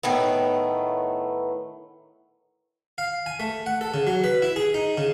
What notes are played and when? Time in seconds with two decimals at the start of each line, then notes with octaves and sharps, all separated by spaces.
0.03 A2 D#3 A3 B3
2.98 F5
3.26 G#5
3.40 A3
3.66 F#5
3.81 A4
3.94 C#3
4.07 F#3
4.24 B4
4.42 E4
4.56 G#4
4.74 D#4
4.97 C#3